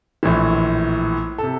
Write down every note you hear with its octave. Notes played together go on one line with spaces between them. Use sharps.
A#1 A2 E3
C3 A4